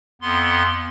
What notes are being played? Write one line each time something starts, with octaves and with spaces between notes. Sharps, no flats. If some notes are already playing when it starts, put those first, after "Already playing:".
F2 B3 C6